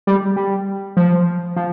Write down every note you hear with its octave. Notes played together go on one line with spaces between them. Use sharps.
G3
G3
F3
F3